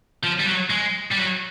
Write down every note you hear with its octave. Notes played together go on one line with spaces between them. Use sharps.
F3
G3
F#3
G#3
G3
F#3